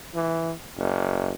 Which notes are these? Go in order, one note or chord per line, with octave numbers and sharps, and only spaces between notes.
E3
F#1